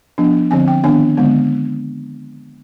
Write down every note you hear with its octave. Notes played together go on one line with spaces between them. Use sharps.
F3 B3 D4
D3 F3 C4 G#5
G5
D#3 B3 D4 G#5
D3 G#3 B3